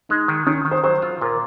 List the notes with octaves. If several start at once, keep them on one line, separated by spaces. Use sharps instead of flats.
G#3 D#4
D#3
D#3 C#4
D#3
C5
F#3 C5
F4
A#2 A#4